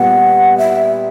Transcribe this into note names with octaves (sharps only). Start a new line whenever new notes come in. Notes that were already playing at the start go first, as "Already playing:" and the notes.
Already playing: A#2 G3 B3 F#5
E5